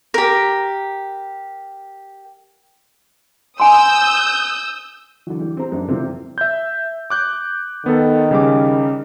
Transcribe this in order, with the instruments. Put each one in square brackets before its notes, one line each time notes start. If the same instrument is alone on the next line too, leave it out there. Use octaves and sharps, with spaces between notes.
[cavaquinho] G4 A#4
[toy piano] G#5 C6 [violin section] D#6 E6 G6
[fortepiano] D3 E3 F#3
E3 G3
C4 G4 C5 A#5
F#2 D4
C3 E3 F3 G3 A#3 C4
[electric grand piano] E5 G6
D6 F#6 G6
[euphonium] D#3 [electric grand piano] B3 A4
[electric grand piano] C#3 G3 D6